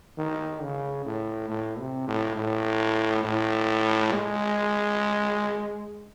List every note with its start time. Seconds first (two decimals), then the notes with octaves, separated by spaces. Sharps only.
0.18 D#3
0.63 C#3
1.06 A2
1.49 A2
1.79 C3
2.08 A2
2.37 A2
3.24 A2
4.12 G#3